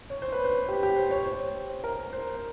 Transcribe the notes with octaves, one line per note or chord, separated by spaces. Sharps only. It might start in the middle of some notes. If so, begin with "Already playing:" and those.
C#5
C5
B4
C5
G4
G4
C5
C#5
C5
A#4
C5